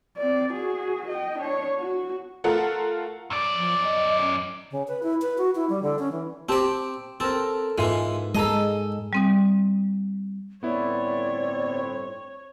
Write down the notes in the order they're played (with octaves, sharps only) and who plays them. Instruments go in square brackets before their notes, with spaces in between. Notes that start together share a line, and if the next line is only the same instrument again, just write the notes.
[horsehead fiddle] C4 D5
F#4 G#4
D#5 G5
D4 C#5
F#4
[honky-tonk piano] A3 F4 A4 A#4 F#5
[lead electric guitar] F#2 D5
[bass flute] F3
D#5
C#4
C#3
B4
E4
B4
F#4
E4
G3
D3
C#4
E3
[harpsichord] C4 D5 [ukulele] G4 A5
[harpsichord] C4 [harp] A4 A#4
[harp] G#2 [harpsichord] E3 G#3 [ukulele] F4 E5 F5
[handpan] G#3 [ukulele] G#4 A5 A#5 [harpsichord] A4 D#5
[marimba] G3 C4 D#6
[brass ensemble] G1 A2 C4 [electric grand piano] B3 E4 [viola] C#5 [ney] D5